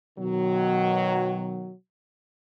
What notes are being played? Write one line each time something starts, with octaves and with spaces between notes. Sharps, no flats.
B2 D#3 F#3